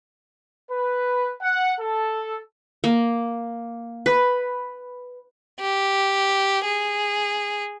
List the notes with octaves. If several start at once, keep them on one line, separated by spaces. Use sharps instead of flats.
B4
F#5
A4
A#3
B4
G4
G#4